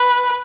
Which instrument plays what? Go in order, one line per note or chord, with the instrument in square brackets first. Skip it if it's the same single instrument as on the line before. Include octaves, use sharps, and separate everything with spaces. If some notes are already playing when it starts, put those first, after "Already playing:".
Already playing: [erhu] B4